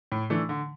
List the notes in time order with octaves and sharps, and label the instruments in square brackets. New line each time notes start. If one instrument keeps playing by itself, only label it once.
[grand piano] A2
E3 A3 D4
D3